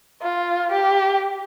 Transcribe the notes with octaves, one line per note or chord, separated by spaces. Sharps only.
F4
G4